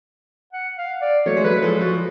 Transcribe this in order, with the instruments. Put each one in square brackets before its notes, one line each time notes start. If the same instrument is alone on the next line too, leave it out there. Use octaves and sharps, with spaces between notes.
[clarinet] F#5
F5
D5
[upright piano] F#3 A3 [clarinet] C#5
[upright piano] G#3
[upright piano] F#3 A3 [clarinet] B4
[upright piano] F3 G#3 [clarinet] A4
[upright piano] F3 [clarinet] F#4